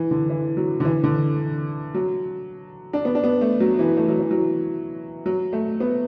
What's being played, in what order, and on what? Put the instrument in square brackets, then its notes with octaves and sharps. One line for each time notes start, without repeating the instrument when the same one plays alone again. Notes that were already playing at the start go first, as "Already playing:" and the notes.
Already playing: [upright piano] E3
D3
E3
F#3
D3
E3
D3
F#3
D4
B3
D4
B3
A3
F#3
E3
A3
F#3
E3
F#3
F#3
A3
B3